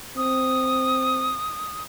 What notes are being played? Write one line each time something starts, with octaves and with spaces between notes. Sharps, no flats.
C4 D#6